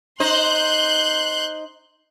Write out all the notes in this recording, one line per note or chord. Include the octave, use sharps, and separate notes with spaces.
D#4 C5 C6 F#6 G6